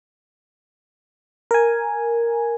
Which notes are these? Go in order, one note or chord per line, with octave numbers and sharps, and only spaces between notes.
A#4 G#5